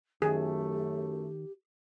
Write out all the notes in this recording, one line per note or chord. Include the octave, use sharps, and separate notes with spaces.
F#2 D#3 A3 G4 G#4